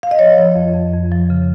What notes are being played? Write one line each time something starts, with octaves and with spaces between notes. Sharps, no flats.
F5
D#5
F3 C#5
F3
F2
F2
F2
F3
C#3